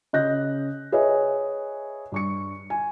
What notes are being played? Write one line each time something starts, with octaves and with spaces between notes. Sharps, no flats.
C#3 D#5 F#6 G6 A#6
G#4 B4 C#5 D#5 E5 G#5
G2 C#6 C#7
G#5